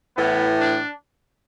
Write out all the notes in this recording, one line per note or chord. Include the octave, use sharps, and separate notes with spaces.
A2 E3 B3
D4